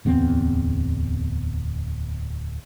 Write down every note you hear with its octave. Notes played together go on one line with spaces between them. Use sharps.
D1 E2 B3 C4